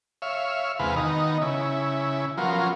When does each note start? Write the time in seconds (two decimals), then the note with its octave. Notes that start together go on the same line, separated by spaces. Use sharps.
0.22 C#5 E5 F5
0.79 E2 C3 G#3 B3 B4 F5
0.96 D#3 B3 D#4
1.42 C#3 E4
2.37 F3 F#3 B3 C#4 F4 A#4